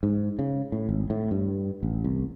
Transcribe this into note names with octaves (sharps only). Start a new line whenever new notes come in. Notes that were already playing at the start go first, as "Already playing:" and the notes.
G#2
C#3
A2
G#1
A2
G2
A1
C2